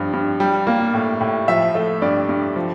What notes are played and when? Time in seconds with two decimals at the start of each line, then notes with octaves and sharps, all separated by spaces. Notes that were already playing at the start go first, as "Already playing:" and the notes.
Already playing: G2 F3
0.13 G2
0.40 G3
0.67 A#3
0.94 A2
1.21 A2
1.48 F3 E5
1.75 A3
2.02 G2 D5
2.29 G2
2.56 F3